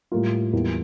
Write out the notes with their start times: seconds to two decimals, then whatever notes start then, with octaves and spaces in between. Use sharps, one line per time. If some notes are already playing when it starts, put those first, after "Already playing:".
0.12 A2 G3 A#3 F4
0.53 E2 E3 G3 A#3